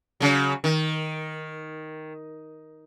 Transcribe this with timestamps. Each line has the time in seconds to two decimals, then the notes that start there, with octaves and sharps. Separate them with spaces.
0.20 C#3 F#3
0.64 D#3